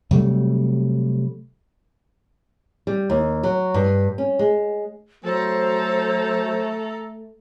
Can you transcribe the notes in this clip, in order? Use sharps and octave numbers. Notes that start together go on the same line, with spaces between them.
C3 F#3 G3 A3
G3
D#2
F#3
G2
C#4
G#3
F#3 A3 A4 C5 A#5